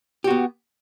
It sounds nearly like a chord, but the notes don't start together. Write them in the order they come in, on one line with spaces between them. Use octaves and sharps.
G4 F#4 B3